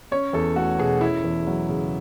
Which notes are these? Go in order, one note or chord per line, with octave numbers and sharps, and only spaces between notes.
C#4 C#5
E2 A4
A3 F#4
B2 G#4
C#4 E4
E2
F#3
C#3